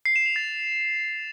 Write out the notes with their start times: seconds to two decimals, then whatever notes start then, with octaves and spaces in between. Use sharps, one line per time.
0.05 C7
0.16 E7
0.26 F7
0.36 A6